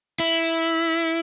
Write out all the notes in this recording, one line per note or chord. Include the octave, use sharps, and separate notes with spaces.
E4